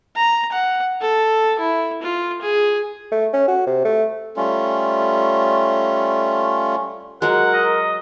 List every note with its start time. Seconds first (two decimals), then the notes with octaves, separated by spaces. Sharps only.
0.16 A#5
0.52 F#5
1.01 A4
1.59 E4
2.02 F4
2.42 G#4
3.12 A3
3.33 C#4
3.47 F#4
3.67 C3
3.85 A3
4.37 G3 A3 C#4 F4
7.22 F#3 G#3 A#4 F#5
7.53 D#5